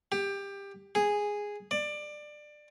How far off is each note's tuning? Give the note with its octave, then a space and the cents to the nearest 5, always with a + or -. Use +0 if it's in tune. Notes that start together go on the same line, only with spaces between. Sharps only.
G4 +20
G#4 -5
D5 +20